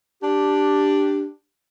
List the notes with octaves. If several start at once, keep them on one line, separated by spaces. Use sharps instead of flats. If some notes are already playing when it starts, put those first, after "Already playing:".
D4 G4